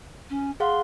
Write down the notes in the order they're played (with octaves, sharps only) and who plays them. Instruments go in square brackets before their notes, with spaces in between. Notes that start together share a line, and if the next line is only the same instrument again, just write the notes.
[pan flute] C#4
[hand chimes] G#4 F5 F#5 [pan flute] C6